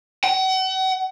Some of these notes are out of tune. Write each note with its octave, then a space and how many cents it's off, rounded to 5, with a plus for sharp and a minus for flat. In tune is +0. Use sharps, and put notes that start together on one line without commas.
F#5 +40